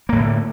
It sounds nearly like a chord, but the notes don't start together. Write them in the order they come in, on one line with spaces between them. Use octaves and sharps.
A#3 A2 D3